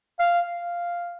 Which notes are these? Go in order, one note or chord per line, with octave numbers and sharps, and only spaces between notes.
F5
F5